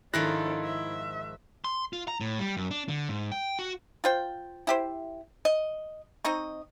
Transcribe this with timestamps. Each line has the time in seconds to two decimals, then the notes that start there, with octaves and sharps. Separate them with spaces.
0.14 G#2 D#3 F3 D4 E4 A4 F#6 A#6
0.64 E5
1.64 C6
1.93 F4
2.08 A#5
2.20 A2
2.39 G3
2.57 F#2
2.71 D4
2.88 D3
3.09 G#2
3.31 G5
3.59 F#4
4.04 F4 C5 G5
4.67 E4 G4 C5
5.45 D#5
6.24 C4 D#4 D#5 C#6